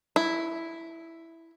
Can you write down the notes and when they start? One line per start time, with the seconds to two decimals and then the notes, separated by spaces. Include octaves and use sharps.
0.16 E4